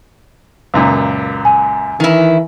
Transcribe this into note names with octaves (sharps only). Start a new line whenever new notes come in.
C#2 F#2 A#2
G#5
D#3 E3 E4